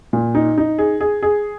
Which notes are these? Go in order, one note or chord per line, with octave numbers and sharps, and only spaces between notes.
A#2
D#4
D#4
G#4
G#4
G#4